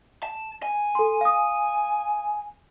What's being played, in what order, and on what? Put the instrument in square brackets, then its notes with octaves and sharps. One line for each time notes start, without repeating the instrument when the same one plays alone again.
[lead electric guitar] A5
G#5
[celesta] A4 C6
F5 D#6